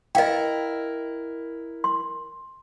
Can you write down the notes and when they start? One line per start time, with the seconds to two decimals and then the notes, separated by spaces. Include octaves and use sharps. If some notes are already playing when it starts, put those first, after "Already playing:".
0.15 E4 A#4 D#5 F5 G5
1.84 C6